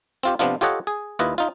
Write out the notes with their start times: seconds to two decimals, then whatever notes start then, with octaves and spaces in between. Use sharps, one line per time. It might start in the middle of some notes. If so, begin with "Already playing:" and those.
0.23 C4 F4 G4
0.39 C3 F3 B3 D4 F4
0.61 F4 G4 A4 C#5 D#5 F#5
0.87 G#4
1.19 D#2 E4 F4 B4 D#5
1.38 D#4 F4